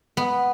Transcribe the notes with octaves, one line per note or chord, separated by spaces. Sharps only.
B3